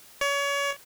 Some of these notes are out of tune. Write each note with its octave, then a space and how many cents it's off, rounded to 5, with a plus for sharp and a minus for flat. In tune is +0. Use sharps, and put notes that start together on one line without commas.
C#5 +30